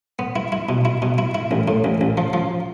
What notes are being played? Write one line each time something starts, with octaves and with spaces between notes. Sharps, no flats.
B3
E4
E4
B2
E4
B2
E4
E4
A1
A2
A1
A1
F3
F3